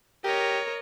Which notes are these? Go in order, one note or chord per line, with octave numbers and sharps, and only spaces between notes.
G4 A#4 C#5 D#5